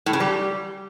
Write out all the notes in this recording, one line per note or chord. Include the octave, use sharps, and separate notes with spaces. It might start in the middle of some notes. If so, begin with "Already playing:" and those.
A2
C#3
G3